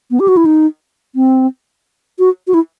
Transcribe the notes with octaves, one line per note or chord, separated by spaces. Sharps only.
B3
G4
F#4
E4
D#4
C4
F#4
F#4
E4